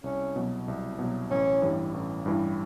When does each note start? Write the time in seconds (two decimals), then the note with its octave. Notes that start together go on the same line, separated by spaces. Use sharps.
0.04 C2 C#4
0.36 B2 F#3
0.68 C2
0.99 B2 F#3
1.31 A1 C#4
1.62 G2 E3 G3
1.94 A1
2.26 G2 E3 G3